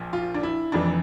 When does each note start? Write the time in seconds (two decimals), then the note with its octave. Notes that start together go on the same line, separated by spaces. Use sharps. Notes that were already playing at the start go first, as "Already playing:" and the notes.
Already playing: A#1 A#2 F3
0.13 F4
0.34 D4
0.43 E4
0.72 F1 F2 E3 D4